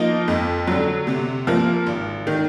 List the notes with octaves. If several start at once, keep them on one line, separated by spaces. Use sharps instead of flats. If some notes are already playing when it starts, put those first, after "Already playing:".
Already playing: F3 A#3 D#4
F2
D3 F#3
C3
F3 A#3
G#1
D#3